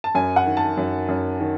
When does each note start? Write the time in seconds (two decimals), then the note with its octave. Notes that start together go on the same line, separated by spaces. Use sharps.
0.04 A5
0.15 F#2 G#5
0.36 F#5
0.46 D#3
0.57 A5
0.77 F#2
1.09 F#2
1.40 D#3